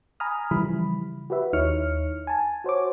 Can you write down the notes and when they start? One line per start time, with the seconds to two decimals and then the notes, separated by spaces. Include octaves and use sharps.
0.20 G#5 A#5 B5 D#6 F6
0.51 C#3 E3 F3 G3 E4 B5
1.30 F#4 G4 B4 E5
1.53 D#2 D#4 E4 C#5 F6 C#7
2.27 G#5 A5
2.64 F#4 C5 C#5 D6